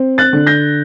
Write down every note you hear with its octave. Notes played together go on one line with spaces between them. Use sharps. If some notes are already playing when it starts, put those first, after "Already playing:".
Already playing: C4
F#6 A6
D3
G6 A#6